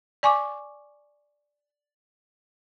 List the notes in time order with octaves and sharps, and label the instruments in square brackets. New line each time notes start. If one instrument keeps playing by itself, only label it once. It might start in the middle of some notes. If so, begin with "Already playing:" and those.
[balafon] D5 G#5 C#6 D6